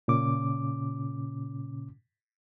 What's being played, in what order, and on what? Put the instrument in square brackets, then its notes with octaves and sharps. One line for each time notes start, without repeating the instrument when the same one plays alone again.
[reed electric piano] A#2 C#3 C#4 D6